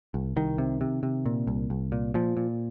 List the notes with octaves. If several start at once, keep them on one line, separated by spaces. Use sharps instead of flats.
C2
C2 D#3
C3
C3
C3
A#2
C2
C2
A#2
A#2 F3
A#2